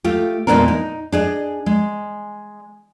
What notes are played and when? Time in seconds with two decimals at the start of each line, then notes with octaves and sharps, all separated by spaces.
0.04 A3 F4 G4
0.47 E2 A#2 G#3 B3 D4 A#4
0.68 D#4
1.12 D4 G#4 D#5
1.66 G#3